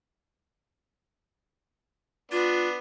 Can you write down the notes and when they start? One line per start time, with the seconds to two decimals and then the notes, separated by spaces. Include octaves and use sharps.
2.32 B3 D4 F4